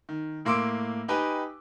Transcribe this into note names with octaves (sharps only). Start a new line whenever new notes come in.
D#3
A2 A#3 C6 D6 E6 D7
D#4 G4 B4 G5 G#5